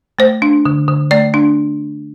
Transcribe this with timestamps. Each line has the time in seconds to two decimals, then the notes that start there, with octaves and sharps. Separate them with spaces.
0.19 A3 C5
0.42 D4
0.66 D3
0.88 D3
1.11 A3 D5
1.34 D4